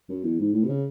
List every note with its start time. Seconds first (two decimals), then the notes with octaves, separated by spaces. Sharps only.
0.09 F#2
0.23 E2
0.39 G#2
0.53 A2
0.64 C3
0.68 C#3